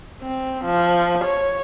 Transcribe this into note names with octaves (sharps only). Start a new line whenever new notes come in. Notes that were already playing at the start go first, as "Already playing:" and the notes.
C4
F3
C#5